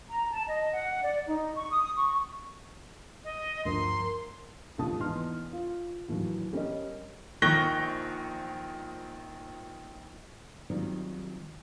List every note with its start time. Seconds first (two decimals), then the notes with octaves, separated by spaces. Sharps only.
0.11 A#5
0.31 A5
0.48 D#5
0.73 F#5
1.03 D5
1.27 D#4
1.55 C#6
1.71 D#6
1.96 C#6
3.24 D#5
3.65 D2 G2 F3 A#4 C6
4.78 D#1 C#2 G#2 F3 A5 D#6
5.00 E2 E3 D#4 C6 F6
5.53 F4
6.08 D#2 A2 E3 F#3
6.53 G3 C#4 A#4 D#5
7.42 A#1 D#3 C#6 F#6 A#6 G7
10.70 D#3 F#3 G3 C4 D#4 F4